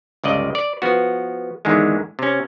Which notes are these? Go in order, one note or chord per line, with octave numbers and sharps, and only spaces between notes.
G1 C#2 D5 D#5
D5
F3 B3 F#4
E2 G#2 D3 D#3 G#3
C3 C#4